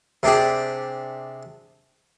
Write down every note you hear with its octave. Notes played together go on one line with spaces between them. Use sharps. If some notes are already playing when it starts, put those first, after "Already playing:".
C3 D4 G4 G#4